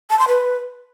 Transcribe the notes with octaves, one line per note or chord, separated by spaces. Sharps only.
A5
C6
B4